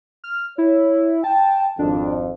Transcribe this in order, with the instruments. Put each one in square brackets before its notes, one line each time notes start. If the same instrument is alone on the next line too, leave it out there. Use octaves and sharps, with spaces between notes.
[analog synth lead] F6
[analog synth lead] E4 [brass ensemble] C#5
[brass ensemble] G5 [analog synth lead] A5
[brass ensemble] G#1 F2 [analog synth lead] D4